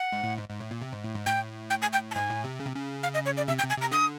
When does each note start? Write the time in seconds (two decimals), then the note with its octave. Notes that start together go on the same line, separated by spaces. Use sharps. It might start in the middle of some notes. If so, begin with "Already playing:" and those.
Already playing: F#5
0.12 G#2
0.23 A2
0.38 G#2
0.49 G#2
0.60 A2
0.71 A#2
0.81 C3
0.93 G#2
1.04 A2
1.15 G#2
1.26 A2 G5
1.70 G5
1.82 G#5
1.93 G5
2.11 A5
2.15 G#2 G#5
2.30 A2
2.44 C3
2.60 C#3
2.66 C3
2.75 C#3
3.03 F5
3.14 D#5
3.26 C#5
3.37 D5
3.48 C3 E5
3.59 G5
3.63 C3
3.70 G#5
3.77 C3 A#5
3.91 D3 D#6